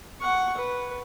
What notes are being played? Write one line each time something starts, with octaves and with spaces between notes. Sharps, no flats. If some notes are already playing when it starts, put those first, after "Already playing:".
F#5 C#6
B4